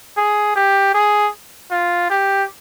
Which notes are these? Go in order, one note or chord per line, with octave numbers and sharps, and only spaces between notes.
G#4
G4
G#4
F4
G4